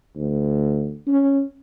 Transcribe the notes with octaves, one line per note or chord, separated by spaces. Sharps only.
D2
C#4